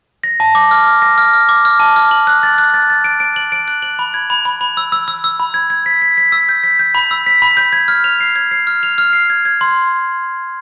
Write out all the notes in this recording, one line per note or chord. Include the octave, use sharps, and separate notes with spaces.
A#6
A5
D6
F6
F6
A#6
F6
F6
D6
F6
A5
F6
F#7
F#6
A6
F#6
A6
A6
D7
D7
F#7
D7
F#6
F#7
B5
G#6
B5
B5
B5
E6
E6
E6
E6
B5
G#6
G#6
B6
B6
B6
E6
G6
B6
G6
B5
E6
B6
B5
G6
G#6
F6
F7
C7
G#6
C7
F6
F7
F6
C7
G#6
G#6
C6